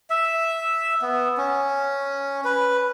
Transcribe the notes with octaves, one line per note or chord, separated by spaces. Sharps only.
E5
B3
C#4
B4